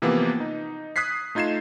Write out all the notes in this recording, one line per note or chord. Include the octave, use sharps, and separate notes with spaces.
C3 E3 F3 A#3 B3
D#4
D#6 F#6 G#6 B6 C7
A3 D#4 F4 G#6 C7 E7